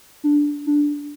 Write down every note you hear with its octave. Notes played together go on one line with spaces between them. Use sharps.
D4
D4